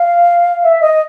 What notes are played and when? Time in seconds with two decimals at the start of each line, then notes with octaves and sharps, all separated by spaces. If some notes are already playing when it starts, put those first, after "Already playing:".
Already playing: F5
0.64 E5
0.82 D#5